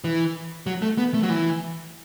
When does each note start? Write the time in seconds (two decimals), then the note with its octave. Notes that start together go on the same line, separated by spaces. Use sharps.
0.04 E3
0.67 F#3
0.82 A3
0.98 B3
1.14 A3
1.23 F#3
1.30 E3